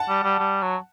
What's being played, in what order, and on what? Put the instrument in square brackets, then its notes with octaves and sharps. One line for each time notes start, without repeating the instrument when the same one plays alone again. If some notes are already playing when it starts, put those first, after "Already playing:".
Already playing: [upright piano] F#5 A5
[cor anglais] G3
G3
G3
F#3